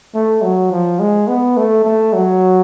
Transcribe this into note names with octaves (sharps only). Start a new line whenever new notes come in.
A3
F#3
F3
G#3
B3
A3
A3
F#3